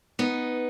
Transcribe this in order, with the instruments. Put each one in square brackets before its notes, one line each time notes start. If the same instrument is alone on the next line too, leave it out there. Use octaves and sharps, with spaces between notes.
[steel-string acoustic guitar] B3 D#4